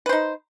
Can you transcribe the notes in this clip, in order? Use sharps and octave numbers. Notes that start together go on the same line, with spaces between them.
D#4 B4 C5